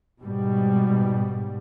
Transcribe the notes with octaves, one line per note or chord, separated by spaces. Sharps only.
G#2 B2 G3